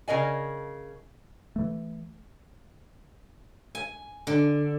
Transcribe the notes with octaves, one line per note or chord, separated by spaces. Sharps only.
C#3 A#4 D#5 G#5
E3 A3
G#5
D3